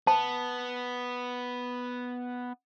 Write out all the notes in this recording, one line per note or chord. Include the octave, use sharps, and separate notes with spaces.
B3 A5